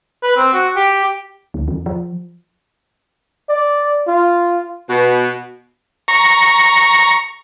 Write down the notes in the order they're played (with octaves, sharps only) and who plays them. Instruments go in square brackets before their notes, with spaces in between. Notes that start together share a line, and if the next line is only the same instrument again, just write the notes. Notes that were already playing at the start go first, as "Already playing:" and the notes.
[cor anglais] B4
C4
F#4
G4
[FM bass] D2
E2
F3
[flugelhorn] D5
F4
[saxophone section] B2
[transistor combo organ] A#5 C#6